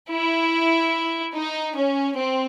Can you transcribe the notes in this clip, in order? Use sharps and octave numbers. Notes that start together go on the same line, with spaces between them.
E4
D#4
C#4
C4